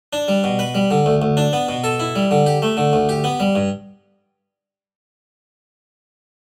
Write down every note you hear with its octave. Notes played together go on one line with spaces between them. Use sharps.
D4
G3
B2
B4
G3
D3
D2
D2
D4
B3
B2
A4
E4
G3
D3
G4
A3
D3
D2
G4
B3
G3
G2